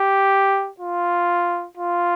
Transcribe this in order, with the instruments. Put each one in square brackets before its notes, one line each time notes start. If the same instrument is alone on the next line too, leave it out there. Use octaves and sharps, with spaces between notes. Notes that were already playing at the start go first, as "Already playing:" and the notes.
Already playing: [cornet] G4
F4
F4